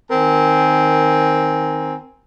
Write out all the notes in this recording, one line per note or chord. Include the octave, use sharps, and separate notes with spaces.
D#3 C4 A#4 G#5